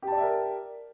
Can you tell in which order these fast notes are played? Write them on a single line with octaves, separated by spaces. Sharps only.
G4 A5 D5 E5 A#4